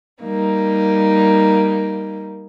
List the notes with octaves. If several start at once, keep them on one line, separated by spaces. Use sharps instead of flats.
G3 A#3 D#4